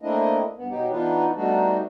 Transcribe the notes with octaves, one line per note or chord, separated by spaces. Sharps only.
A3 A#3 C4 D4 E4 D#5
G2 B3
B2 F#3 D#4 G4
E3 B3 D4 D#4 F4 B4
G3 A3 B3 D4 D#4 F#4